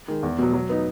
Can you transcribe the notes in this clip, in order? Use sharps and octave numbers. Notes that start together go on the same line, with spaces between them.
D#3 G#3
E2
B2 F#3
F#3
B3 D#4